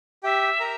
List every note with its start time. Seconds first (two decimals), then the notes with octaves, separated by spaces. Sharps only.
0.24 G4 E5 G5
0.60 A#4 A#5